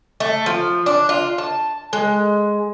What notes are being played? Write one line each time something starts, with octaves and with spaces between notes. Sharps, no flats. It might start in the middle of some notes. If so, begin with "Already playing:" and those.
A3
F3
D4
F4
A5
G#3